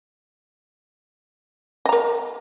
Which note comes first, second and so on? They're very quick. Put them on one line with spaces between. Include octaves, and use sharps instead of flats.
D#5 A#5 A#4